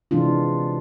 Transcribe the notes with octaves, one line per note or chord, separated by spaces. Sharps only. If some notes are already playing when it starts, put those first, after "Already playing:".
C3 E3 G#3 D4 F4